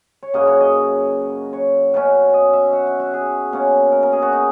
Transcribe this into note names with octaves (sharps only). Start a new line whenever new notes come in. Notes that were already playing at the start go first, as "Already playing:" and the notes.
C#5
F#2 C#3 F#3 A#3 D#5
C#5
D#5
C#5
B2 F#3 C#4
D#5
E5
F#5
E5
F#4
G#4
B2 A#3 C#4
A#4
A#4
G#4
F#4
D#4